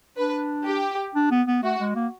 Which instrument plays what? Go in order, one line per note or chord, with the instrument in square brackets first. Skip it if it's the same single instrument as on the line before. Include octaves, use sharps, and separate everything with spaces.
[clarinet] D4 [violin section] B4
[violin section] G4
[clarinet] D4
B3
B3
[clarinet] A3 [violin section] F#4
[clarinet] G#3
A#3